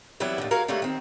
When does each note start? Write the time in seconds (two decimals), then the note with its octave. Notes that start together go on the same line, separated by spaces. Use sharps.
0.20 E3 F#3 G3 B3 C4 E4
0.38 D#2 A2 D3
0.51 G#3 F#4 A#4 C#5 F5
0.68 D3 G3 A3 A#3 F#4 C#5
0.82 D#3 C4